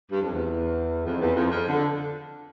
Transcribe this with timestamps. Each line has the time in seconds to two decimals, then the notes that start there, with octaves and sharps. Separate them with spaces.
0.11 G2
0.21 F2
0.32 E2
1.05 F2
1.21 E2
1.36 F2
1.52 F2
1.67 D3